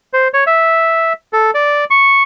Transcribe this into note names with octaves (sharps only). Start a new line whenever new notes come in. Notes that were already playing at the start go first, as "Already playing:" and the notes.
C5
C#5
E5
A4
D5
C#6